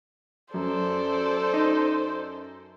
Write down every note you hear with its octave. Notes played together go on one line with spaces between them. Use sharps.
F#2 A4 C5 D5
D#4